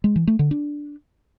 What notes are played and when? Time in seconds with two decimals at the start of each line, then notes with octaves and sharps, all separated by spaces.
0.04 G#3
0.16 E3
0.27 A3
0.39 D3
0.51 D4